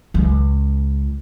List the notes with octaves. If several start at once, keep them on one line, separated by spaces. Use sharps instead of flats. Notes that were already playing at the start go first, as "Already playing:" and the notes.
C#2 G#3